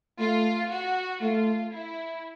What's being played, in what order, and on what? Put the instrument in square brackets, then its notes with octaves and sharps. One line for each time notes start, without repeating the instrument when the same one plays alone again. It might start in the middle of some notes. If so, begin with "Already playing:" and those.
[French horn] A3 [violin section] F4
[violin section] F#4
[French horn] A3 [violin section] F4
[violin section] E4